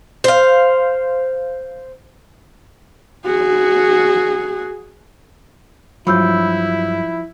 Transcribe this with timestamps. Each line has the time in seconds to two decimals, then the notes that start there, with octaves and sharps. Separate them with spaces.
0.24 C5 F5
3.25 F#4 G#4
6.07 G2 F3 F#3 E4 B5 E6 G6